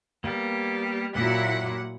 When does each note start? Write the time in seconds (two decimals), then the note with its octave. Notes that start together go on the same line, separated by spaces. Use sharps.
0.24 G3 A#3 B3
1.15 A#2 F#3 A#3 E4 G4 E5 F#5